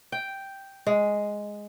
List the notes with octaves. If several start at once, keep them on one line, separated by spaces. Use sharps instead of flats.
G5
G#3